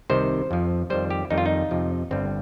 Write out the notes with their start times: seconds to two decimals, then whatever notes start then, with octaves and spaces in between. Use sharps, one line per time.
0.10 C2 C3 D#3 C5
0.51 F2 F3
0.90 F2 D#3 G3 C5
1.11 G4
1.31 F2 D#3 G3 D#4
1.38 F4
1.46 D#4
1.71 F2 C3 F3
2.11 G1 G2 G3 C4